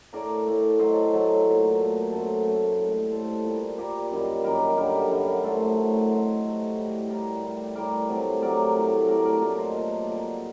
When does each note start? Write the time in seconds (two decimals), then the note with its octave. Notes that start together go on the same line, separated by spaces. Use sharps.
0.13 A2 A3 A#4 D5
0.47 A2 A3
0.79 A2 F#3 A3 C5 D#5
1.13 A2 F#3 A3
1.46 A#2 A3
1.79 A#2 A3
2.12 F#2 F#3 A3 A4 C5
2.45 F#2 F#3 A3
2.78 A2 G3
3.12 A2 G3 A4 C5
3.44 A#2 G3
3.77 A#2 G3 G4 A#4
4.12 F#2 D#3 G3
4.44 F#2 D#3 G3 G4 A#4
4.77 F#2 D3 G3 G4 A#4
5.11 F#2 D3 G3
5.43 A2 F#3 A3 A4 C5
5.77 A2 F#3 A3
6.10 C3 F#3 A3 C5 D#5
6.43 C3 F#3 A3
6.77 A2 G3
7.09 A2 G3 A#4 D5
7.43 A2 G3
7.75 A2 G3 A#4 D5
8.09 C3 F#3 A3
8.42 C3 F#3 A3 A#4 D5
8.76 A2 A3
9.08 A2 A3 A#4 D5
9.24 A#4 D5
9.41 A#2 F#3 A3 A#4 D5
9.58 C5 D#5
9.75 A#2 F#3 A3
10.08 A#2 G3 A#4 D5